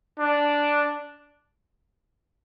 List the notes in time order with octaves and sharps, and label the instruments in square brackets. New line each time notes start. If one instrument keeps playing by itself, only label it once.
[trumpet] D4